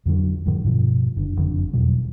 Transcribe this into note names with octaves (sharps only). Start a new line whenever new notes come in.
F2 D3 F#3
G#2 D3 F3 G3
G2 B2 F3
F#1 D3
F#1 F2 D3
E2 B2 F#3 G3